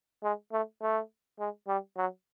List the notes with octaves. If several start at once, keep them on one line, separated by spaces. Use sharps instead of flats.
G#3
A3
A3
G#3
G3
F#3